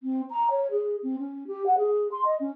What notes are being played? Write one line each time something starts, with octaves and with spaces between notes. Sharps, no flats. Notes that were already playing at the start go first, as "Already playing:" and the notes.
C4
A#5
C#5
G#4
C4
C#4
G4
F#5
G#4
C6
D#5
C#4